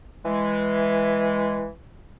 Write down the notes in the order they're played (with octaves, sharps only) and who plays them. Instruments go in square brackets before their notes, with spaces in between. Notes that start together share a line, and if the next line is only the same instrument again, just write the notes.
[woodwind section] E3 G#3